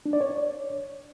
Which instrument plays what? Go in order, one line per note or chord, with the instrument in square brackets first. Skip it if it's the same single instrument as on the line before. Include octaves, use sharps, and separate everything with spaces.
[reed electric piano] D4
D5
C#5